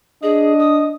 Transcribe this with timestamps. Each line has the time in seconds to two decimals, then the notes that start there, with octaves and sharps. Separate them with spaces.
0.23 D4 G#4 D#5
0.59 D#6